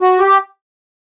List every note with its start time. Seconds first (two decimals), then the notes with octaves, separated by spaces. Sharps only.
0.01 F#4
0.19 G4